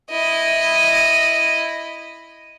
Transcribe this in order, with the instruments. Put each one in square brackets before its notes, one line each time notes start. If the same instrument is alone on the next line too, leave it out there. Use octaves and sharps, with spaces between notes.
[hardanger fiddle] E4 D#5